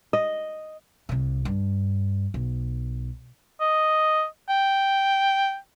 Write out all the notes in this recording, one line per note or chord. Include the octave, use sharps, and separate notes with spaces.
D#5
C2 C3
G2
B1
D#5
G5